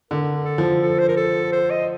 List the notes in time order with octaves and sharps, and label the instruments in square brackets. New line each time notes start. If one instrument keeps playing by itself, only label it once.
[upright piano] D3 [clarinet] A#4
[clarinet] A4
[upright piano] F3
[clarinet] A4
C5
A#4
A4
C5
D#5